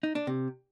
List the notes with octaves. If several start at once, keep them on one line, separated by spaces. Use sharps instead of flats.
D#4
D4
C3